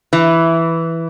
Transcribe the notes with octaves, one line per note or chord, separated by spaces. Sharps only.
E3